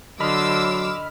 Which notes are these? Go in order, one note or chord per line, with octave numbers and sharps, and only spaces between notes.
D3 F#3 D#5 B5 C6 D6 E6 F6